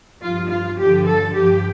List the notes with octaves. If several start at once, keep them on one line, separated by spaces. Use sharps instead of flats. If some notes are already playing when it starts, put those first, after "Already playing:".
G2 F3 F4
F4
G2 D3 F3 G4
A4
G2 F3 G4